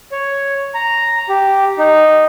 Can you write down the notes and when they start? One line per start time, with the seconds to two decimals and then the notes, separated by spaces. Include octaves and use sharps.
0.12 C#5
0.74 A#5
1.29 G4
1.78 D#4